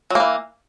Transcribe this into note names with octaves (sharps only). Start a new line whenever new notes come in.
E3 F#3 A#3